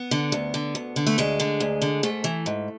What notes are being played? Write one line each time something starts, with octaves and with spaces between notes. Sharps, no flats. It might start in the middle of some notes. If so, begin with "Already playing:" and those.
Already playing: B3
D3
D2
D3
D2
D3
A3
D2 G#3
D3
D2
D3
G#2 A3
E3
G#2